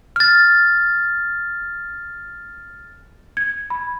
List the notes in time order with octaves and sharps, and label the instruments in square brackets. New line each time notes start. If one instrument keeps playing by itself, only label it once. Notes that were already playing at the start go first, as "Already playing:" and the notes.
[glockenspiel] F6 A6
[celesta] G#6
B5